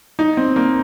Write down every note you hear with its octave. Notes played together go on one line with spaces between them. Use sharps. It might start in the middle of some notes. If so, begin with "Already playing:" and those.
D#4
C4
A#3